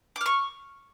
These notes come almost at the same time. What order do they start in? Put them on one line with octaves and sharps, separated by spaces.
D6 F6 C#6